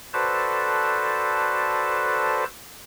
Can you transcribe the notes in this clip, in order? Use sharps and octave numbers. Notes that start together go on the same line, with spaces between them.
F#4 A4 B4 C5 D5 A5